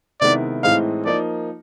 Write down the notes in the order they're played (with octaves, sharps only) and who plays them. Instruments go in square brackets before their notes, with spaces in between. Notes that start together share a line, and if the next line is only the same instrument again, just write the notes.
[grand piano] C3 D#3 G#3 B3 E4 [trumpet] D5
[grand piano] A2 E3 G#3 C4 D#4 [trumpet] F5
[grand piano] F3 A#3 D#4 [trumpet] D5